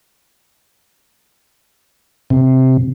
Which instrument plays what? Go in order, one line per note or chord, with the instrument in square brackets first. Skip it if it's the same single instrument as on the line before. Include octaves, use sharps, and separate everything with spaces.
[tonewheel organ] C3